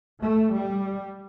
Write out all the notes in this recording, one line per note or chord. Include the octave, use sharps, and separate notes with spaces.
A3
G3